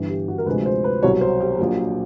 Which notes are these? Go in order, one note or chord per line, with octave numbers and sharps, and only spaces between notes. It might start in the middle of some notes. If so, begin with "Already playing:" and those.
Already playing: G1 G2 E3
G4
F#4
A#4
D2 C3 F3 G#3 B4
C5
B4
C2 B2 F#3 C#5
C5
G4
A#1 A#2 F#3